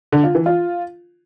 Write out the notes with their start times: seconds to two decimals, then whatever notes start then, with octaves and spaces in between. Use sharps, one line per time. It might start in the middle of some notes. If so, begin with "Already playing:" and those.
0.12 D3
0.24 F4
0.35 E3
0.46 F4